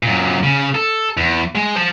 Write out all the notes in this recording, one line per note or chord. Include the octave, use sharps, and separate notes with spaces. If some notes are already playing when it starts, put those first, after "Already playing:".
F#2 A#2
C#3
A4
E2
G#3
C5 A5